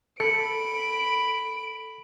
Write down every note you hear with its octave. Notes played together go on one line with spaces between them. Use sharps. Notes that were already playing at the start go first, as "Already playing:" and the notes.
A4 B5 C#7 D7